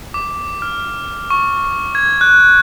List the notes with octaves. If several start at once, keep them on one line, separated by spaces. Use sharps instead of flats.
D6
F6
C#6
G#6
F#6